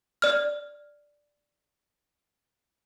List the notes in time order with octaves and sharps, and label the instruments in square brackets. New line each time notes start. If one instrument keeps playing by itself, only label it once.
[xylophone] D5 F6